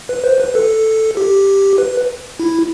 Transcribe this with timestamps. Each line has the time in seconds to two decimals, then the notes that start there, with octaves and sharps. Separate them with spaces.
0.09 B4
0.24 C5
0.40 B4
0.55 A4
1.17 G4
1.78 B4
2.40 E4